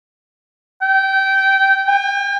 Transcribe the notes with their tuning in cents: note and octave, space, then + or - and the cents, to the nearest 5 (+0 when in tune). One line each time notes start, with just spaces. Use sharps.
G5 -20
G5 +45